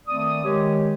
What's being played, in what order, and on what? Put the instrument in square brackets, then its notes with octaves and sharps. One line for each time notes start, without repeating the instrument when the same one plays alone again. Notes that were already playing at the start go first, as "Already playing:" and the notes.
[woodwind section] D#3 A3 C4 D5 D#6
D#3 G#3 G4 C#5